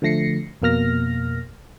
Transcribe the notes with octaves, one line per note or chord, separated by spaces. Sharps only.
D3 F3 A3 A#6 C7 C#7
F2 B2 A#3 F6 A#6